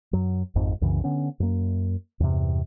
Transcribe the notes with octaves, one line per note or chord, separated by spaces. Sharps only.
F#2 F#3
G#1 F2 G#2
C2 F#2 C#3 E3
D3 B3 C#4
F#2 A#3
E2 G2 C3